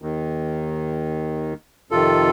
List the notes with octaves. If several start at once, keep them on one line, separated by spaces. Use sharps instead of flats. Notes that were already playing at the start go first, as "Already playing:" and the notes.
D#2 D#3
F2 C3 D#3 F4 A4